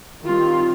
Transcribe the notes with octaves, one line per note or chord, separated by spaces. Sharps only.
D#3 G3 C4 F4